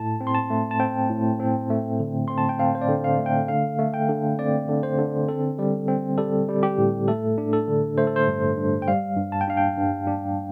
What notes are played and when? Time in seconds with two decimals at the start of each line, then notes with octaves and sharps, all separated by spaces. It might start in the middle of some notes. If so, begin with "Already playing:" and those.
Already playing: A2 A5
0.20 C4
0.27 C6
0.35 A5
0.50 A3
0.71 A5
0.80 C4 G5
1.09 A2
1.40 C4
1.70 A3
2.00 D3
2.28 C4 C6
2.38 A5
2.49 G5
2.59 C4 F5
2.75 C5
2.81 D5
2.89 D3
3.04 F5
3.19 A3
3.26 G5
3.48 D3 F5
3.78 A3
3.94 G5
4.09 D3
4.39 C4 D5
4.69 D3
4.83 C5
4.98 D3
5.29 C4 A4
5.59 G3
5.88 C4
6.18 G3 A4
6.49 G3
6.63 G4
6.78 A2
7.08 A3 A4
7.38 D4
7.53 A4
7.68 D3
7.98 A3 C5
8.07 A4
8.16 C5
8.28 G2
8.58 G2
8.82 G5
8.87 G3 F5
9.17 G2
9.32 A5
9.41 G5
9.48 D4 F5
9.57 G5
9.78 G2
10.07 D4